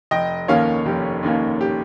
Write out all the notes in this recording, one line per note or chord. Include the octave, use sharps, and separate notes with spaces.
F1 D#5 G5
D#2 D#3 A#3 C#4 C#5 F5
F1 G4
D#2 D#3 A#3 C#4
G4